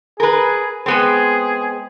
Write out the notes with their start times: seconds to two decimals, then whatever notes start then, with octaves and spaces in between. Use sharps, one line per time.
0.20 G#4 A#4 B4
0.86 G#3 B3 C4 G#4